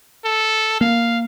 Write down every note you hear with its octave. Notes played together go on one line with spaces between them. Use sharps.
A4
A#3 F5